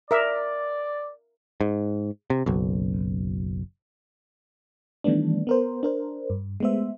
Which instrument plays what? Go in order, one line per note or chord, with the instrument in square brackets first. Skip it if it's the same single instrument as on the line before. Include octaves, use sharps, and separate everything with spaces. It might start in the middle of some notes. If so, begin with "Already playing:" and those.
[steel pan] A#4 E5 [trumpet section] D5
[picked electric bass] G#2
C3
F#1 B1
[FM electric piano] D#3 E3 G3 A3 B3 D4
B3 A#4 C5
D4 A#4 C5
G2
G#3 A3 B3 C5 E5